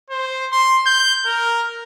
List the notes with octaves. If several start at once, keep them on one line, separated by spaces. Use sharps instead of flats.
C5
C6
G6
A#4